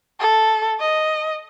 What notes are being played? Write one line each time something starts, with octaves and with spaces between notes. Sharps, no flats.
A4
D#5